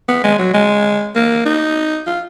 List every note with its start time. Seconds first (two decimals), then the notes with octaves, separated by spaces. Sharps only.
0.08 B3
0.24 G#3
0.38 F#3
0.53 G#3
1.15 A#3
1.45 D#4
2.06 F4